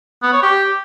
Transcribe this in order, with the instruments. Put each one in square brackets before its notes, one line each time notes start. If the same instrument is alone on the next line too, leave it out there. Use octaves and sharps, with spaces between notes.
[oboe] B3
C#5
G4